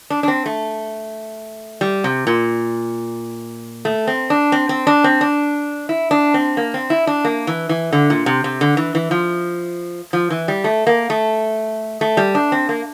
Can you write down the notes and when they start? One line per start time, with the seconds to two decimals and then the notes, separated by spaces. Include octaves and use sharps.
0.10 D4
0.23 D4
0.28 C4
0.46 A3
1.81 G3
2.04 C3
2.27 A#2
3.85 A3
4.07 C4
4.30 D4
4.52 C4
4.69 C4
4.87 D4
5.04 C4
5.21 D4
5.89 E4
6.11 D4
6.34 C4
6.57 A#3
6.74 C4
6.90 E4
7.07 D4
7.25 A#3
7.47 E3
7.69 E3
7.93 D3
8.10 A#2
8.26 C3
8.44 C3
8.61 D3
8.77 E3
8.95 E3
9.11 F3
10.13 F3
10.30 E3
10.48 G3
10.64 A3
10.87 A#3
11.10 A3
12.01 A3
12.17 G3
12.35 D4
12.52 C4
12.69 A#3